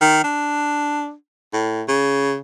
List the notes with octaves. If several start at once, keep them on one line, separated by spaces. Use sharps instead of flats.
D#3
D4
A2
C#3